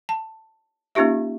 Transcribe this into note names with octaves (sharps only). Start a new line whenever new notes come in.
A5
A#3 C#4 D#4 F4 G4 E5